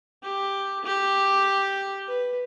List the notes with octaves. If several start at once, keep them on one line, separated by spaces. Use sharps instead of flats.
G4
G4
B4